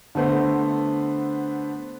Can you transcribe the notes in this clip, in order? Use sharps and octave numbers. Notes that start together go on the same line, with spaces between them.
D3 A3 B3 C5